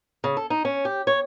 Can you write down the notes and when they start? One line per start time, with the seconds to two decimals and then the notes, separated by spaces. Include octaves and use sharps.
0.24 C#3
0.37 A4
0.50 D#4
0.65 C#4
0.85 G4
1.07 C#5